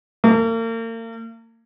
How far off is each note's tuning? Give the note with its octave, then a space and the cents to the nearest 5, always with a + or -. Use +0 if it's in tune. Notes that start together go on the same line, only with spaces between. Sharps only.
A#3 -40